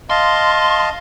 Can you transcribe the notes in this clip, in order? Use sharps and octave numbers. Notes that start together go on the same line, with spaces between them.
D#5 F5 A5 C6